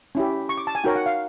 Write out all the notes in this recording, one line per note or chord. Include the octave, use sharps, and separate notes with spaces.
C#4 E4 G4
C#6
D6
A5
G#5
D#4 F#4 A#4 C#5 G5
F#5
F5